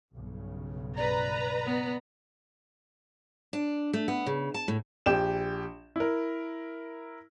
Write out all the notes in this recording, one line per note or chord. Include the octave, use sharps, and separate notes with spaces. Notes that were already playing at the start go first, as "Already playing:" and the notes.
B1 G2 C#3
B4 D5 A#5
B3
D4
A3
B3
C#3
A5
A2
A#1 G4 E7
E4 A#4